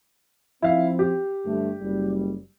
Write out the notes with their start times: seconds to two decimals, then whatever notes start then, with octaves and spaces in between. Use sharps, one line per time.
0.62 F3 C4 E4 F5
0.99 G4
1.46 G1 G2 A3
1.80 F#1 G3